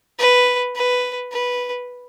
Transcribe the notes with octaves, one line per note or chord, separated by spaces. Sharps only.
B4
B4
B4